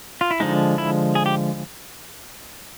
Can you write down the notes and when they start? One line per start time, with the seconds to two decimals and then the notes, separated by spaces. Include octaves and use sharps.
0.21 F4
0.31 E4
0.40 D3 F3 G#3 D#4
0.78 E4
1.15 G#4
1.26 G4